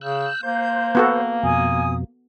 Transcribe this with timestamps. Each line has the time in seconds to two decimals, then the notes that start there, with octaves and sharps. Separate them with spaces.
0.01 C#3 E6 F#6 G6
0.43 A#3 C5
0.95 B3 F#4 A4
1.43 F2 B2 G#5 D#6